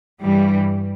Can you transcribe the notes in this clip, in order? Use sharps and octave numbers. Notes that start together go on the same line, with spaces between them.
G2 E3 G3